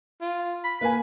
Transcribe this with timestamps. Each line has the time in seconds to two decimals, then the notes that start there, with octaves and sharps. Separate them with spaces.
0.21 F4
0.64 B5
0.81 A#3 B4 G#5